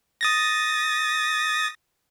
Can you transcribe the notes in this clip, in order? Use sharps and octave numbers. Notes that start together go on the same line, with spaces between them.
D#6 A6 A#6